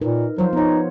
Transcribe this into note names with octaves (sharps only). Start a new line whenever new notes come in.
A#2 D#4 A#4 B4
F3 F#3 F4 C5
B3 D#4 C#5